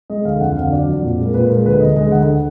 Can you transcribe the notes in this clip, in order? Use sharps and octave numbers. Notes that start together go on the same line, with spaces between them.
G#3 D#5
D2 F5
F2 F#5
D3 F5
F#3 D5
F2
A#2
G#3
A#4
A#2 B4
G#3 A#4
D2 B4
D3 D#5
G#3 D#5
D2 F#5